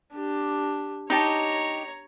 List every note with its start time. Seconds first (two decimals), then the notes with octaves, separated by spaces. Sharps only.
0.13 D4 G4
1.10 D#4 G4 C#5 A5 A#5